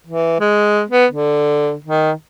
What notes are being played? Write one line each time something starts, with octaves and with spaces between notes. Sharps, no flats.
E3
G#3
B3
D3
D#3